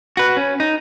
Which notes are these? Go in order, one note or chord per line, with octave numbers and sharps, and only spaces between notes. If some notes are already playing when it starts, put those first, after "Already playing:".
F#4 B4
C#4
D#4